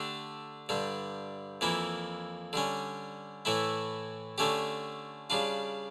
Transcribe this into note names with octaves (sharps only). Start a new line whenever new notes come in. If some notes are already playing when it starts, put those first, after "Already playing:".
Already playing: D3 A3 D4 G4
G2 D3 G3
F2 E3 A#3 E4
D3 G3 C#4
A2 E3 A3 E4
D3 A3 C#4 G4
C#3 G3 D4 F4